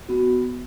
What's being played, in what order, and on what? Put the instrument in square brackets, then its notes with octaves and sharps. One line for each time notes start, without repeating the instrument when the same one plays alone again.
[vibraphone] B3 F#4